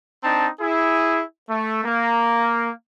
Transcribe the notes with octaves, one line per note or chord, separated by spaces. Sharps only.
C4 D4 D#4 A5
E4 G#4
A3
A#3